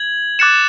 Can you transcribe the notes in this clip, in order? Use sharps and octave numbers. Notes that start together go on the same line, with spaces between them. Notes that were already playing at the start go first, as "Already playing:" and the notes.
Already playing: G#6 F#7
D6 F#6 A6 C#7 E7